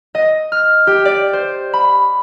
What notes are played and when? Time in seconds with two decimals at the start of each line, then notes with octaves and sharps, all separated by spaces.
0.15 D#5
0.52 F6
0.87 G4
1.05 D5
1.33 C5
1.73 B5